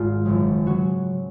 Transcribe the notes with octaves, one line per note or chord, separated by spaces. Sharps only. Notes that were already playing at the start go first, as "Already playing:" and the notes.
Already playing: G#1 G#2 F4
F#1 F#2 C#3 F3
C#3 F#3 F#4